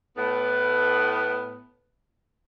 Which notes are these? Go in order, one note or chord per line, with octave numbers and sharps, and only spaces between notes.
A2 B3